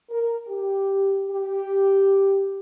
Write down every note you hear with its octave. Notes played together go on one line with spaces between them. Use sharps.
A#4
G4
G4